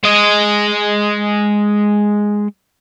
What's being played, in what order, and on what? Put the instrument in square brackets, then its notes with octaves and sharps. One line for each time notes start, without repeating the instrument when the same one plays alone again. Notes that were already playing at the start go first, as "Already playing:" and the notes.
[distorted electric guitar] G#3 D#5